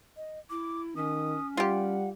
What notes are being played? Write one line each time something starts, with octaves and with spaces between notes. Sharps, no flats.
D#5
E4 D6
D#3 C#4 D#6
G3 F4 G4 F#5